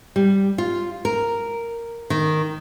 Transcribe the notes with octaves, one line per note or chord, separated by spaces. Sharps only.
G3
F4
A#4
D#3